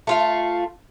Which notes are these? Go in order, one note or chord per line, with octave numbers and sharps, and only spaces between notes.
A3 F4 F5